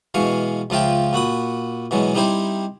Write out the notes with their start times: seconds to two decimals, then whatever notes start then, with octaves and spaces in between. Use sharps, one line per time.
0.14 B2 E3 G#3 F5 C#6
0.70 C#2 F3 F4 E5 G5
1.13 A#2 F#4 B5 D#6
1.91 B2 E3 F#3 G#3
2.15 G3 C4 D#4 E4 G4 C5